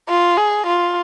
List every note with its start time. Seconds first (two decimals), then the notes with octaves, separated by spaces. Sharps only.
0.09 F4
0.37 G#4
0.66 F4